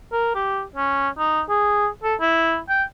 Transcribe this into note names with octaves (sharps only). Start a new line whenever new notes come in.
A#4
G4
C#4
D#4
G#4
A4
E4
G5